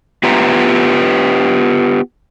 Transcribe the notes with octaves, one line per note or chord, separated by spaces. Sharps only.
B3 F4 G4 B4 E5 A#5